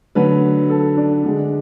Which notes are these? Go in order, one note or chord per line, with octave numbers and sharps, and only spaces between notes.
D3 F#3 A3 B4
A4
D4
D3 G#3